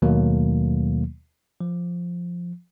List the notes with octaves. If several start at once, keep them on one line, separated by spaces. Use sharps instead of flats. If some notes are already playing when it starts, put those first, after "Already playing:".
D#2 B2 D#3 F#3 A3 A#3
F3